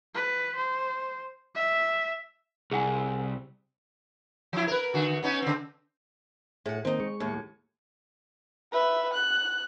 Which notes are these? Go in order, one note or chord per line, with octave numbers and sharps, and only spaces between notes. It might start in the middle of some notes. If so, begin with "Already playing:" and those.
B4
C5
E5
C2 G#4 F#5 G#5
F3 E4
A#4 B4
D3 F#4
B3 C#4 D#4
C#3 C4
A2 G#4 F#5
D#3 A#3 C4 D#4
G#3 C#6
D#2 A2
B4 E5
F#6